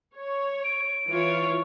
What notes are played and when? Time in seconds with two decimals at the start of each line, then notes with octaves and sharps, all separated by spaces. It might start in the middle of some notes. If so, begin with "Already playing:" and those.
0.16 C#5
0.64 D7
1.09 E3 F4 C#5